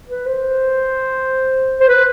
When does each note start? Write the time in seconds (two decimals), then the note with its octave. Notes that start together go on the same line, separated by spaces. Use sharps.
0.08 B4
0.26 C5
1.80 C5
1.88 B4